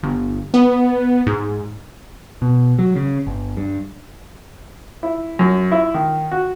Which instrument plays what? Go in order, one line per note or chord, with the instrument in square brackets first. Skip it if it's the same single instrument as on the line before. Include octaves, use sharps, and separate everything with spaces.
[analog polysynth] G1
B3
G#2
[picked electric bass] B2
F#3
C#3
G1
G2
[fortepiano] E4
F#2
E4
D#3
F#4